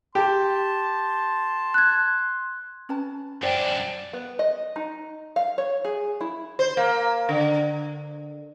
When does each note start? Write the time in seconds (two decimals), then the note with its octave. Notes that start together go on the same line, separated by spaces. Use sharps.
0.15 G4 A5 C6
1.74 F#6 G#6
2.89 C#4 B4 A5
3.43 F#2 D4 C5 D5 G5
4.13 B3
4.39 D#5
4.76 D#4
5.36 F5
5.58 C#5
5.85 G#4
6.21 E4
6.59 C5
6.77 A#3
7.29 D3